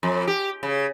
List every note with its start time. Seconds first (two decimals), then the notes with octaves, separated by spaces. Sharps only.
0.03 F2
0.27 G4
0.63 C#3